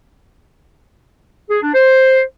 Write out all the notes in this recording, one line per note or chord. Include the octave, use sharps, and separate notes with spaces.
G#4
D4
C5